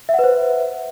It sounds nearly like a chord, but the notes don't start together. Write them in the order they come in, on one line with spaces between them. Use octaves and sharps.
E5 F#5 B4 C5